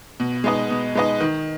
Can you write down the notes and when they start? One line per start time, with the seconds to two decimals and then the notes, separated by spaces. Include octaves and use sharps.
0.20 B2
0.44 G#3 D#4 B4 D#5
0.70 B2
0.95 G#3 D#4 B4 D#5
1.20 D#3